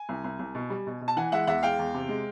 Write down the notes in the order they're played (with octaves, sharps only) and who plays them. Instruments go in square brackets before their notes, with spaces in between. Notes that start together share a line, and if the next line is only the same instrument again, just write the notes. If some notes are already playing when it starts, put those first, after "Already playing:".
Already playing: [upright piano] G#5
C2
C2
C2
B2
G3
B2
B2
A5
E3 F#5 G#5
G#3 E5 F#5
E2 E5 F#5
G#3 F5 G5
E2
C3
G#3